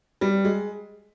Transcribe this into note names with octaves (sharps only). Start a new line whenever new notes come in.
G3
G#3